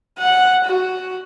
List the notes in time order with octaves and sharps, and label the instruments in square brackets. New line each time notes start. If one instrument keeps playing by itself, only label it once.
[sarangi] F#5
F#4